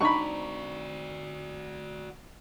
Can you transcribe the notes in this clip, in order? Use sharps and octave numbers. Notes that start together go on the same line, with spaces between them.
C4 D4 D#4 F#4 D5 B5 C#6